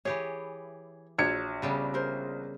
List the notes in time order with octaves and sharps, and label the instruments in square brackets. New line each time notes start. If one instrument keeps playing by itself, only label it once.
[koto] E3 G4 G#4 [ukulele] C#5
[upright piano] A#1 C#7 [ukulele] F#4 C#5
[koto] C#3 G3 B3
[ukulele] A#4 C5